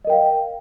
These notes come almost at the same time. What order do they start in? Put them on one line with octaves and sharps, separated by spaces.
D#5 A#4 G5 F5